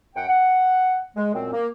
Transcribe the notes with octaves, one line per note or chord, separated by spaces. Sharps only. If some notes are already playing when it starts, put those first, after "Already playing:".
F#2 F#5 G5
F#5
G#3
F#2 A#2 C4
A#3